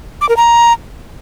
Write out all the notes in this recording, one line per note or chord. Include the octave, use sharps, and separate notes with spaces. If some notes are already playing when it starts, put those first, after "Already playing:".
D6
A#4
A#5